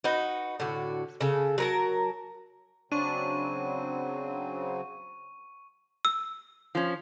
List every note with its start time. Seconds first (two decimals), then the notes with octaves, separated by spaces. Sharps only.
0.04 D#4 F#4 B4
0.60 A2 D3 F#4
1.21 C#3 A4
1.58 F#3 A#4 A5
2.92 C#3 F#3 C4 D4 C#6 D#7
6.05 E6
6.75 F3 C#4